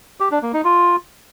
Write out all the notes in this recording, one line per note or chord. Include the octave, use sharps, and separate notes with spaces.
G4
D4
A#3
D#4
F4